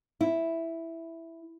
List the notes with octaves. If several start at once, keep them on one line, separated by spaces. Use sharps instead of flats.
E4